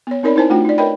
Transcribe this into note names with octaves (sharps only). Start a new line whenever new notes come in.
B3 C#5
C4 D#4 A#4 C#5 D5 B5
D#4 E4 A#4 C5 G#5 A5
A3 D4 F4 F#4 G5
D#4 D5
A#4 B4 C#5 D#5 G5 B5